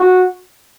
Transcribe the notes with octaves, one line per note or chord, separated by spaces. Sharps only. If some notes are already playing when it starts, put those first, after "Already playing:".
Already playing: F#4